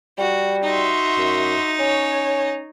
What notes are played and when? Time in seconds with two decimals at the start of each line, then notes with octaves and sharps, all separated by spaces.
0.18 G3 F#4
0.63 D#4 F#4 E5 C6
1.18 F#2
1.79 C#4 C#5